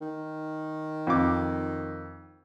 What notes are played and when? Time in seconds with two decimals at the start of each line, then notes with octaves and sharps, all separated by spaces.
0.01 D#3
1.07 F2 D6